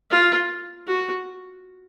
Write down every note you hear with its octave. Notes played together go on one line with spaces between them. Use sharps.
F4
F#4